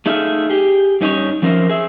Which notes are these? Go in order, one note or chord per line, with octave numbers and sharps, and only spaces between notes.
A3 D#4 G#4 E5 F5
G4 G#4
G2 C#4 D#4 G4 C#5
F2 F3 C#4 A#4 C5 E5
G#4 E5